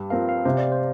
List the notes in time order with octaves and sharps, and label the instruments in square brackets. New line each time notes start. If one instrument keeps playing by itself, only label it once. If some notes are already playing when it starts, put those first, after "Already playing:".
Already playing: [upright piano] G2 [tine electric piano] G4
[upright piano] F3 C4 A#4 [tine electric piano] F5
[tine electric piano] F5
[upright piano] C3 [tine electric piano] C5
[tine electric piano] D5
C5